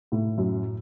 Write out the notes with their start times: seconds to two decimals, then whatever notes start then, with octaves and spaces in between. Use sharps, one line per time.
0.12 A2
0.38 F#2